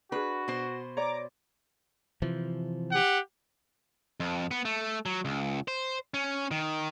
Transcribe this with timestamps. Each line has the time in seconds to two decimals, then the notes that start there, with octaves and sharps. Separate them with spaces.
0.12 D4 F#4 G#4 B4
0.48 B2 C5
0.97 C#5 D5 A#5 D6
2.22 C3 E3 F3
2.92 G4 F#5
4.20 F2
4.51 B3
4.65 A3
5.06 F#3
5.25 C#2
5.68 C5
6.14 C#4
6.51 D#3